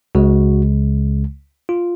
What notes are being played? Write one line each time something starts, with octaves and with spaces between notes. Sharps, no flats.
C#2 C#3 G#3 F#4
F4